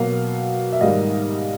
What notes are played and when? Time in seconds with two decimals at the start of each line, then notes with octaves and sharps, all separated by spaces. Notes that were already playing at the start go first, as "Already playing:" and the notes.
Already playing: B2 F#3 A#3 F5
0.72 E5
0.81 G#2 D#3 G3 A#3 D#5 F5